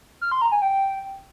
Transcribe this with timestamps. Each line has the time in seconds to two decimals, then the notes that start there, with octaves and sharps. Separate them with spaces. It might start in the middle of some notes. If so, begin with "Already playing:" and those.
0.21 F6
0.32 C6
0.42 A#5
0.52 G#5
0.62 G5